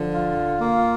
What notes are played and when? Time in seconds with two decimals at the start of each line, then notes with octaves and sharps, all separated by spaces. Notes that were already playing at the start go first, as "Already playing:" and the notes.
Already playing: D3 F3
0.14 F4
0.60 A#3